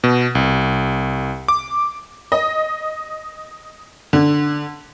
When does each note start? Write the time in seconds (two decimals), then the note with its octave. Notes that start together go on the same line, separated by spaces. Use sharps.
0.04 B2
0.35 C2
1.48 D6
2.32 D#5
4.13 D3